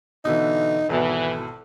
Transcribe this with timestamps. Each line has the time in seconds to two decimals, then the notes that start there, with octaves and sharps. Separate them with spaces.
0.25 B2 D3 E3 D#4
0.89 G#1 B2 E3 A4